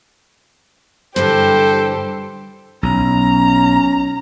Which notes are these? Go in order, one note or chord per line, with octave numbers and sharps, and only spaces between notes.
G2 D3 E3 G4 A4 C5
B1 C#4 A#5